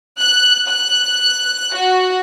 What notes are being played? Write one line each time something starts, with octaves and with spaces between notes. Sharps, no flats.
F#6
F#6
F#4